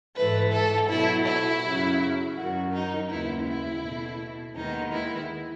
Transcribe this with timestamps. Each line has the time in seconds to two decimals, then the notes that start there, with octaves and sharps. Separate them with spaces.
0.15 G#2 E3 A3 B4
0.52 A4
0.89 B2 F#3 A3 E4
1.26 E4
1.62 F#2 C#3 F#3
2.36 F#2 D#3 F#3 F#4
2.72 D#4
3.09 D#2 C#3 G#3 B3 E4
3.46 E4
3.82 B2 A3
4.56 D#2 D#3 G#3 B3 D#4
4.92 E4